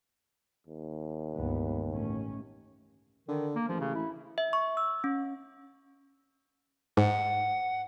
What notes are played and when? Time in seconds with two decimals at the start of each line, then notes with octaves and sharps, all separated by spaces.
0.67 D#2
1.36 G1 C#2 B3
1.91 A1 A3 C#4
3.28 D3 D#3
3.55 A#3
3.69 A1 F3
3.80 C#3
3.95 E4
4.38 E5
4.53 C#6
4.77 E6
5.04 C#4
6.97 G#2 F#5